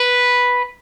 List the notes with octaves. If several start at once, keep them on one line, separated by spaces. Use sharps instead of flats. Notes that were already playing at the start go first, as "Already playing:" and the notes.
Already playing: B4